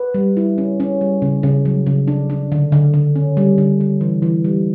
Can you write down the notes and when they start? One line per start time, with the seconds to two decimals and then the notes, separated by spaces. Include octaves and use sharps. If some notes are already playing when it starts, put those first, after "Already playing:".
Already playing: B4
0.14 G3
0.37 E4
0.58 C#4
0.80 C#4
1.01 G3
1.22 C#3
1.43 C#3
1.65 F#3
1.86 C#3
2.08 D4
2.30 D4
2.52 D3
2.72 D3
2.94 D3
3.16 C#4
3.37 G3
3.58 D3
3.81 G3
4.01 E3
4.22 E3
4.44 G3